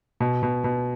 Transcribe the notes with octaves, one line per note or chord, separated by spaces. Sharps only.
B2
B2
B2